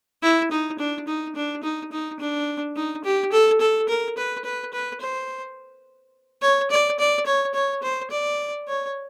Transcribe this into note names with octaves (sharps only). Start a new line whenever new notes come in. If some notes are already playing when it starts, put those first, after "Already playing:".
E4
D#4
D4
D#4
D4
D#4
D#4
D4
D#4
G4
A4
A4
A#4
B4
B4
B4
C5
C#5
D5
D5
C#5
C#5
C5
D5
C#5